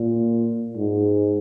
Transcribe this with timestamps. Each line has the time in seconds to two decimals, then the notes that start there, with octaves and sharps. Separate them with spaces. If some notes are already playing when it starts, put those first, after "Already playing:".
Already playing: A#2
0.76 G#2